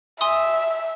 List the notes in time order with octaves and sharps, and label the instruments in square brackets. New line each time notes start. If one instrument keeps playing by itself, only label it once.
[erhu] E5 [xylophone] G#5 C6 D#6